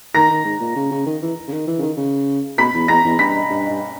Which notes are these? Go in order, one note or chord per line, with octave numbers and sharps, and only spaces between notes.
D#3 A#5 A#6
D#3
G#2
A#2
C#3
C#3
D#3
E3
C#3
D#3
E3
C#3
D#3
C#3
B2 B5 B6
E2
E2 A#5 A#6
E2
G2 B5 B6
G2
G2